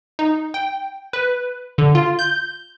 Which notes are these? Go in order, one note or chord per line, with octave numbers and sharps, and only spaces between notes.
D#4
G5
B4
D3
F4
G6